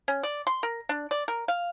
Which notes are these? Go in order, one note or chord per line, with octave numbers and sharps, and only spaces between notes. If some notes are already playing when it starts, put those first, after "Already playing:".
C#4
D5
C6
A#4
D4
D5
A#4
F5